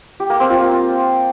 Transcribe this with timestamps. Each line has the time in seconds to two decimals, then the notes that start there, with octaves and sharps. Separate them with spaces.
0.20 G4
0.30 A#3
0.40 C4
0.50 F4
0.60 A#3